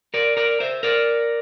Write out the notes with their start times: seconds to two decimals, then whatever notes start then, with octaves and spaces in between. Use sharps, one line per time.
0.14 A#4 D5
0.37 A#4 D5
0.60 C5 E5
0.83 A#4 D5